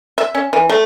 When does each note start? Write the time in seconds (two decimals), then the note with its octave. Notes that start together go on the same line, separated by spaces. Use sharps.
0.18 E5
0.35 C#4
0.53 E3
0.69 A3